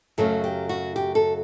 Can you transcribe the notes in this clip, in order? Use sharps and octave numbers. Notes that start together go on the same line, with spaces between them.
F#2 C#3 F#3 A3 C#4 A4
G4
F#4
G4
A4